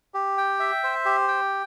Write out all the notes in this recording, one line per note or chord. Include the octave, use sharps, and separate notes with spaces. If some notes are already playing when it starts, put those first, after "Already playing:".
G4
G5
E5
C5
G4
G5